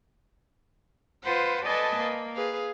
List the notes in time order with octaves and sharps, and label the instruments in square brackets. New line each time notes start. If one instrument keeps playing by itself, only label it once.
[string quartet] F4 B4 C5 F#5
A4 B4 D5 D#5 G#5 A5
A#3
G#4 B4 F5